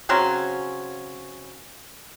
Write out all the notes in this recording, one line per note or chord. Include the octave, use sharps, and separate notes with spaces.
C#3 F#3 C4 C#4